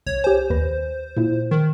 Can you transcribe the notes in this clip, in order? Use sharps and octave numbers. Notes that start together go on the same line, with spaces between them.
C2 C#5
G4 C5 G#5
D#2 B4 A#6
A#2 E4
D#3